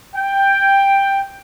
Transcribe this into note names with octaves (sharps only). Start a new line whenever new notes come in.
G5